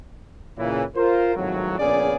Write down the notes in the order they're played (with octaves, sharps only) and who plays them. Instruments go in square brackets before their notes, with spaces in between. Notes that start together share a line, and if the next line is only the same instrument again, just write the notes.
[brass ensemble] A#2 C#3 E3
F4 A#4 C5
G#1 F2 A2 F#3
A#1 C#3 B3 C#4 G#4 D5